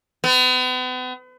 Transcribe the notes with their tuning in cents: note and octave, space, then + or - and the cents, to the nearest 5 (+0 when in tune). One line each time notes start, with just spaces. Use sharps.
B3 +40